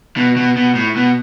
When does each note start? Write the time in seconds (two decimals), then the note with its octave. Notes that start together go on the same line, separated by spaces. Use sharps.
0.17 B2
0.37 B2
0.56 B2
0.75 A2
0.96 B2